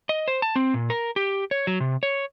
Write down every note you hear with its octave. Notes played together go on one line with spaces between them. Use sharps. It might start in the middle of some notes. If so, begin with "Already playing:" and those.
D#5
C5
A5
C4
A#2
A#4
G4
C#5
F#3
C3
C#5